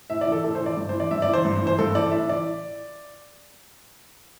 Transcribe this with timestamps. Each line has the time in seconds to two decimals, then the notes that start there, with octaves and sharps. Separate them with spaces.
0.10 A2 E5
0.21 D5
0.26 E3
0.32 A4
0.44 A2 A4
0.55 C5
0.61 E3
0.66 D5
0.77 G2
0.89 E3 C5
1.00 D5
1.11 G2 E5
1.22 D5
1.28 E3
1.33 C5
1.45 G2
1.62 E3 C5
1.78 G2 A4
1.95 E3 D5
2.12 A2 E5
2.29 E3 D5